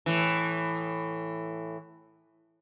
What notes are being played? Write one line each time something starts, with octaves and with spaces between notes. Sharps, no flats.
A2 E3